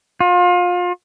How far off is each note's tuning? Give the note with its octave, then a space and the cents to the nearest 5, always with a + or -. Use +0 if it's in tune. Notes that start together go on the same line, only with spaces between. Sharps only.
F4 +30